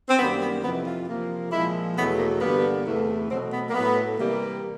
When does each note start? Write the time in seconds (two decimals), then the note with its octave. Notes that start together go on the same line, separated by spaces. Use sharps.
0.09 C4
0.19 F#2 D#3 G3 A#3 B3
0.41 B3
0.63 F2 C3 E3 B3
0.86 F4
1.07 C3 F3 A#3
1.52 A#2 F3 G#3 E4
1.97 E2 B2 F#3 A3 B3
2.19 A#3
2.40 G2 D3 G3 A#3 B3
2.85 E2 C3 E3 A3
3.29 B2 F#3 A3 C4
3.52 B3
3.69 A#3
3.74 A2 F#3 A3 B3
4.18 C3 E3 G3 A#3